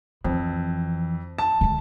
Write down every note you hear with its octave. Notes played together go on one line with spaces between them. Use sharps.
F2 E3
A5
D3 G#3